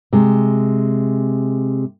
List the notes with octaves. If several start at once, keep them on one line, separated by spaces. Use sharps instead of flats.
C3 G#3